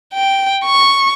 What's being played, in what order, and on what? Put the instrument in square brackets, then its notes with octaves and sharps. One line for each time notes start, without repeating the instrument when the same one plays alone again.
[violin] G5
C#6